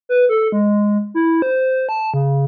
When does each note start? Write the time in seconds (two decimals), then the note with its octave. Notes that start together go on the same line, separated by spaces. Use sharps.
0.09 B4
0.29 A4
0.52 G#3
1.14 E4
1.42 C5
1.89 A5
2.14 C#3